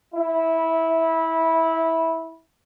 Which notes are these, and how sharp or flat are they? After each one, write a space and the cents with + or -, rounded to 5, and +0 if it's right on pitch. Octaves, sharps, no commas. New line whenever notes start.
E4 -15